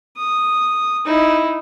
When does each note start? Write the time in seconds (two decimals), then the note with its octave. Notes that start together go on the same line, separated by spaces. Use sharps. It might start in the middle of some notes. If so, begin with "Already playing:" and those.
0.17 D#6
1.05 D#4 E4